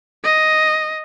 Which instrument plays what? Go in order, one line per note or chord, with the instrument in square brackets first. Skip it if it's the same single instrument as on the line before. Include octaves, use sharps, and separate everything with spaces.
[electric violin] D#5